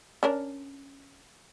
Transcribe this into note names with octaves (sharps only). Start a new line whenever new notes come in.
C#4 D4 A#4